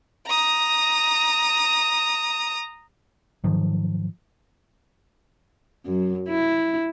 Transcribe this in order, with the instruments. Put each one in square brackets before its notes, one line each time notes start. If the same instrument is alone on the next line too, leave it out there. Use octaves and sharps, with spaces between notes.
[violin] A#5 D#6
[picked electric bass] G#2 D#3 F3 F#3
[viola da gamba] F#2
E4